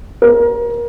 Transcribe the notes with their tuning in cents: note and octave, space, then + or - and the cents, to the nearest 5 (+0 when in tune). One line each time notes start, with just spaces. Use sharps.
A#4 +25